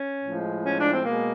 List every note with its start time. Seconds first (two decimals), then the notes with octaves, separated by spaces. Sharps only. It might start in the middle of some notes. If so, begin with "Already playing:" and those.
Already playing: C#4
0.25 A2 F3 G#3
0.65 C#4
0.78 D4
0.92 C4
1.05 B2 G#3 A#3